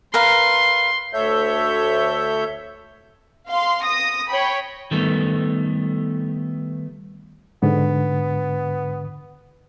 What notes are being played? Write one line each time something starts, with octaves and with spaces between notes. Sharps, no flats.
A#4 B4 F5 C6
D2 A4 C#5 E5 G6
F5 C6
D#6 A#6
C#5 G5 B5
D#3 G3 A3 B3 A4
G#2 D3 B3